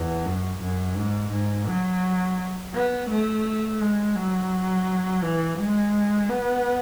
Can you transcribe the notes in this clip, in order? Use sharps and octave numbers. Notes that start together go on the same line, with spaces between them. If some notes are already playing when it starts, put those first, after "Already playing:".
Already playing: E2
F#2
F#2
G#2
G#2
F#3
B3
A3
G#3
F#3
E3
G#3
B3